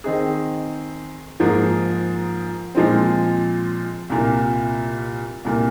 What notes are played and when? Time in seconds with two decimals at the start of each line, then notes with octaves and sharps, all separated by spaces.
0.04 D#3 C4 D#4 G#4
1.40 G#2 F3 A#3 G#4
2.75 A#2 F3 G#3 C4
4.09 C2 A#2 A#3
5.44 C2 A#2 A#3